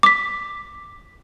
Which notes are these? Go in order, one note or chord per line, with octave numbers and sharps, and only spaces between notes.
D6 B6